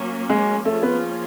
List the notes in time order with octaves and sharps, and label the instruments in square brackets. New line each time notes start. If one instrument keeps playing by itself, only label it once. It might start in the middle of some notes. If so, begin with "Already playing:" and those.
Already playing: [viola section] F#3 A#3 C#4
[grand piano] G#3
[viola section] F3 A#3 C#4 F4 G#4 [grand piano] A3
[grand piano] B3